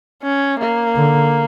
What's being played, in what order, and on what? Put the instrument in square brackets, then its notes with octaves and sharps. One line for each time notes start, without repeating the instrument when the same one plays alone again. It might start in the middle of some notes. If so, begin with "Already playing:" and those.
[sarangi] C#4
A#3
[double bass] D3